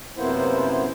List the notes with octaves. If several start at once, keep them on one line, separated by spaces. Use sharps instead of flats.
F#2 C3 A#3 B3 E4 C5